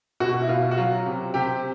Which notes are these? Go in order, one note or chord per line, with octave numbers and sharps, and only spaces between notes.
B2 F#4
E4
B2 F4
F#4
F#3 F4
C3
C3 G4